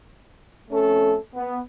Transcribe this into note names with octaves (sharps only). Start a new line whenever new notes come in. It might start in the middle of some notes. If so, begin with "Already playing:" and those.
F2 A3 C#4 A4
B3